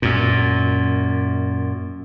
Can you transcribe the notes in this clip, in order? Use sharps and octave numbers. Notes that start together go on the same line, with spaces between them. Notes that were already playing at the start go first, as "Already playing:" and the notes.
F#2 A#2